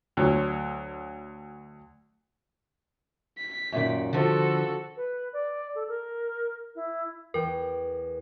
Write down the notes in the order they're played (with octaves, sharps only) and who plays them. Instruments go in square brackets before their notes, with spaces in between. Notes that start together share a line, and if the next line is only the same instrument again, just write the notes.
[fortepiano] D2 F#3
[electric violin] B6
[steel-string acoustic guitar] F#2 A#2 D#3
[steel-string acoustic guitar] D3 F3 [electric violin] F#4 A4
[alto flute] B4
D5
A4
A#4
E4
[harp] E2 G5 [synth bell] A#4